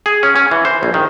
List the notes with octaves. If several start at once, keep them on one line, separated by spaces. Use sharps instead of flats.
G#4
C#4
C#4
E3
C5
A#1
D#3